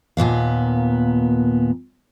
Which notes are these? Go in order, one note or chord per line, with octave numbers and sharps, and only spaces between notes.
D#2 A#2 B3 F5